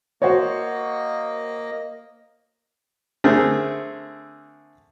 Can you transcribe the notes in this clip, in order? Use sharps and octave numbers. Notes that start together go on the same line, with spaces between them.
A#3 F#4 C5 C#5 D#5
D3 A3 C4 G#4 A#4